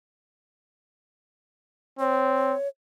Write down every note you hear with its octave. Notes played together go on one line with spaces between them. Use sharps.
C4 C#5